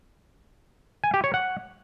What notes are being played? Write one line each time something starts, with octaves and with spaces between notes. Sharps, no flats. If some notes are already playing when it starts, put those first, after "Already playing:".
G#5
G4
C#5
F#5